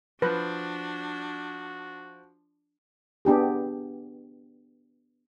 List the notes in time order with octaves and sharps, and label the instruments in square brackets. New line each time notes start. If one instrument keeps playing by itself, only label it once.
[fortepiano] F3 [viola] D4 [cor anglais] F#4 [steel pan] B4
[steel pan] B3 D4 G4 G#4